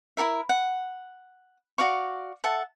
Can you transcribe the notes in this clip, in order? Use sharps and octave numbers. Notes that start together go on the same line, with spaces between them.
E4 F#4 A#4 E5
F#5
F#4 D5 F5 C#6
A4 E5 F#5 A5